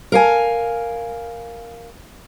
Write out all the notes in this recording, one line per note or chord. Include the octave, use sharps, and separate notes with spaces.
A#4 F5 G#5